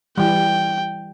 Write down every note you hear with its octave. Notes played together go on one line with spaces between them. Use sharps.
E3 G3 G5